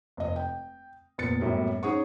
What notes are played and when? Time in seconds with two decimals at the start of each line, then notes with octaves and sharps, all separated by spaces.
0.17 F1 D#5
0.36 G5
1.18 F1 A#2 B3 A6 C#7
1.40 F#2 A2 G3 A#3 B3
1.83 C#4 D#4 G#4 F#5 C#6